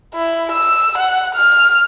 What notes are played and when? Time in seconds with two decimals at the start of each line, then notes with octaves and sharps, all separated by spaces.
0.14 E4
0.52 E6
0.98 F#5
1.35 F6